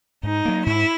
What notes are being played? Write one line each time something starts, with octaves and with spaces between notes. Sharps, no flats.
G#2 D#4
F#3 A#3
G#2 E4